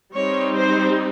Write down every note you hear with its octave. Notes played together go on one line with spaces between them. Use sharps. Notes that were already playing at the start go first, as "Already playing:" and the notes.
G3 C4 D#4 C#5
C5